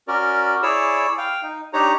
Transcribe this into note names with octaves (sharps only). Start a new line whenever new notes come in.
C#4 F#4 A#4 D5
E4 G#4 C#5 D5 E6
F5 G5
D#4
D4 D#4 G4 C#5 A#5